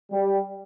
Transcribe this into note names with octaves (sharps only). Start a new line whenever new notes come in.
G3